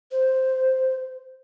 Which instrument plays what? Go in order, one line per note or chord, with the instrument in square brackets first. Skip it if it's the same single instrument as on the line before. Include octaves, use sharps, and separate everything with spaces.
[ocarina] C5